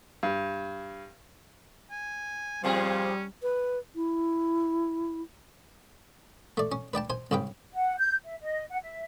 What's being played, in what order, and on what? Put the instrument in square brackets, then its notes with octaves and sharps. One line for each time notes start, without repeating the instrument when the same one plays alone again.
[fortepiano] G2
[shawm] G#5
[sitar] A#2 C4 G#4 [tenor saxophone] F3 [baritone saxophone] G3 [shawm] C#4
[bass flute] B4
E4
[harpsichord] A3 D5
C#4
B4 D5 G5 A5
C5 G#5
C2 G#2 C#3 B4 G5
[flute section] F#5
G6
E5
D#5
F#5
E5